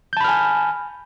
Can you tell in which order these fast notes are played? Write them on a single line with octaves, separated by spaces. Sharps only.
G6 A5 B5 F6 G#5